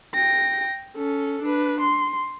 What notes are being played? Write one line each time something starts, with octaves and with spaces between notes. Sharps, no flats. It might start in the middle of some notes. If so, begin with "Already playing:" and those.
G5 A#6
C#4 A4
D4 B4
C6